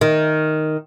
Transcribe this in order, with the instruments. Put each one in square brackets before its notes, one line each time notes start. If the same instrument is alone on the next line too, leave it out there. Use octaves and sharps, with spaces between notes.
[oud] D#3